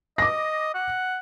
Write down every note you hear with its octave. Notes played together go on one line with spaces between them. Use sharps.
D#5 D6 A#6
F#5